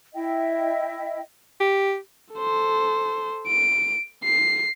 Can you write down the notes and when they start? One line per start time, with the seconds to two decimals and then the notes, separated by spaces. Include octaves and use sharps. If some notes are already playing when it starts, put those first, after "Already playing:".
0.14 E4 D#5 E5 G5
1.60 G4
2.34 A4 C5
3.47 D7
4.24 C7